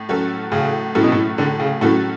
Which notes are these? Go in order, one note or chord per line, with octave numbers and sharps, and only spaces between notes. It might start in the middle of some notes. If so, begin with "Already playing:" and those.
Already playing: A2
F#3 C#4 F#4 A4
A2 C#3
A2 F#3 C#4 F#4 A4
B2
A2
A2 D3
C#3
A2 F#3 C#4 F#4 A4